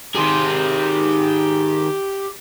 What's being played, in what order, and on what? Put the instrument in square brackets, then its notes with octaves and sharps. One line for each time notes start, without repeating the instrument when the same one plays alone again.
[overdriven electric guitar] D#3 G#4 [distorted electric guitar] G4 C6